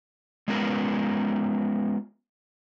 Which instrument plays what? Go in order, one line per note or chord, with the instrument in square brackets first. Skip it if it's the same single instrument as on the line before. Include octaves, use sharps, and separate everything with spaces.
[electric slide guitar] G#3 B3 C#4 F4 A#4 B4